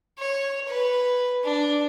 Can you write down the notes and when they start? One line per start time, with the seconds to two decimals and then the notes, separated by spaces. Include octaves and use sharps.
0.18 C#5
0.68 B4
1.43 D4